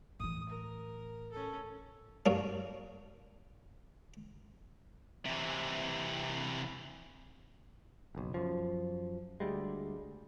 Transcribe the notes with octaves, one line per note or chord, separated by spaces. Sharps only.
A2 E3 D#6
A#4
C#4 A4
G2 A#3 C#4
C3 E3
F#1 B1
F#2 F3
D2 G3 G#3